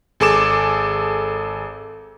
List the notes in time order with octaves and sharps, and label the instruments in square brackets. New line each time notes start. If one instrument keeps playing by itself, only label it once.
[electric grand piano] G#1 G#4 A4 D6 E7